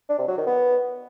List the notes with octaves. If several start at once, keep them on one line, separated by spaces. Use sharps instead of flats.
D4
C3
F#3
D#3
B3